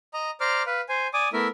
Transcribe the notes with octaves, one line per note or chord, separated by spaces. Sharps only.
D#5 A#5
C5 D5 A#5 D6 F6
B4 F5
C5 G#5
D5 G#5 D6 D#6
A3 B3 E4 A#4 E5